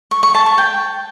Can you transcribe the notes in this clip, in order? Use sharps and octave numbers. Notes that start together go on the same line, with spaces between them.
C#6
C#6
A5
C#6
G5